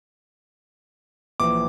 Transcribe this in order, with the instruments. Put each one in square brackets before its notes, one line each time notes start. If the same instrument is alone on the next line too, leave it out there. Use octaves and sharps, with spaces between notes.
[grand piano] A#1 E3 [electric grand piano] D6